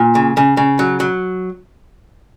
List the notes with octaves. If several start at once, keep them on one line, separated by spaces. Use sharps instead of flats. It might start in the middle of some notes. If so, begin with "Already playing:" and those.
Already playing: A#2
C#3
C#3
C#3
F#3
F#3